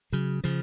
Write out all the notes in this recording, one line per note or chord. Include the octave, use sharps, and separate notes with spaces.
C#3 F#3
C#3 F3